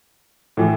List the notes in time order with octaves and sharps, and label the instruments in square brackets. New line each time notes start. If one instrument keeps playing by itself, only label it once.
[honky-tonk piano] A2 E3